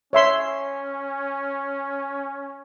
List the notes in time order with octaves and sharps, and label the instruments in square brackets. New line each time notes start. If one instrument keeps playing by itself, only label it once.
[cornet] C#4 [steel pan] C#5 E5 C6